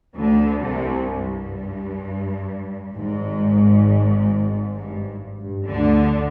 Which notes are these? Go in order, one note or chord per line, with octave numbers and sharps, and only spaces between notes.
D2 D3
C2 C3
G2
G#1 G#2
G2
G2
D2 D3